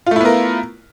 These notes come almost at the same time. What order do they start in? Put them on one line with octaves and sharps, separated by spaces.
F4 A3 E4 B3 A#4